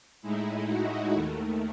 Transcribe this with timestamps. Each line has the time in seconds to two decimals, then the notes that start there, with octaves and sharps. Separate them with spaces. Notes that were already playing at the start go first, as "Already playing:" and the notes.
0.22 A2 G#3 D#4 E4
0.67 F#4
1.13 D#2 D#3 A3